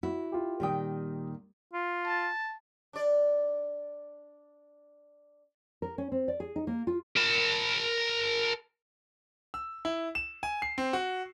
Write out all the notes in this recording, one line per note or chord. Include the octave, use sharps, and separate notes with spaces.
E4 F#4
F4 G4
A#2 D#3 G3 G5 D#6
F4
A5
D4 D5
A#4
C#4
C4
D5
G#4
D#4
A#3
F4
A#4 A5
E6
E4
E7
G#5
C7
C4
F#4